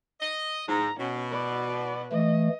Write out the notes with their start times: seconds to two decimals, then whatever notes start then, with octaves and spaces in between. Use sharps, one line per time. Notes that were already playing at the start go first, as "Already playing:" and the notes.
0.20 D#5
0.68 G#2 A#5
1.00 B2 C#4
1.31 B4 D5
2.12 E3 A3 D#5